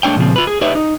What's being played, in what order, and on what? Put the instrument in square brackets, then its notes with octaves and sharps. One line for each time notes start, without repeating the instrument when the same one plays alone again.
[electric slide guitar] G#3 A3 D4 C#5 G5
A#2 C#3 F3 C4
F4 B4
G#4
D#4 G4 B4 C#5 D5 E5
D#4